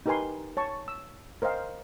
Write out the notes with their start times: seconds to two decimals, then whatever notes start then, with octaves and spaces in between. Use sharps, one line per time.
0.06 D#4 G4 A#4 B4 G#5 C6
0.57 C#5 A5 C#6
0.88 E6
1.42 A#4 C5 D#5 F5 G5